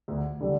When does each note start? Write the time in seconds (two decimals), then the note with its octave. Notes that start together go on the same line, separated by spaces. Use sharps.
0.08 D2
0.41 D3 G3